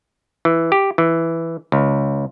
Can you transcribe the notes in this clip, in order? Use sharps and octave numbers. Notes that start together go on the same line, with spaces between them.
E3
G4
E3
C#2